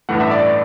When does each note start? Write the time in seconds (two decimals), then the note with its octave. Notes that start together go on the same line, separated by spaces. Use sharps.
0.09 A1 G2 E3 A3 F#5
0.20 E5
0.31 D5
0.43 D5